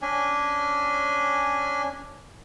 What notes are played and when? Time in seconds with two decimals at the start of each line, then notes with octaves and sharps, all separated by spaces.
0.02 C#4 D4 G#5